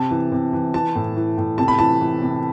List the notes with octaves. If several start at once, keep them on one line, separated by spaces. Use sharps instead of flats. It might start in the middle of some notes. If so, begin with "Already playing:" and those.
Already playing: C3 A5
E3
C3
E3
E3 A5
A2
E3
A2
C3 A5
B5
E3 A5
E3
C3